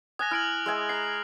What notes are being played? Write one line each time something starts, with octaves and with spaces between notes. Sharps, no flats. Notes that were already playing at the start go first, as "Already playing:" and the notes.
G#5 D#6 F#6 A#6
E4 F6 D7 F#7
G#3 E5 G#5
A#5 C7